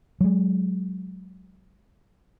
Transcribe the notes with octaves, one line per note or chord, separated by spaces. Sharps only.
F#3 G#3